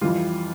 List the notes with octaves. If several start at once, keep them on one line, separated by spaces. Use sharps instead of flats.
F2 E3 G3 F4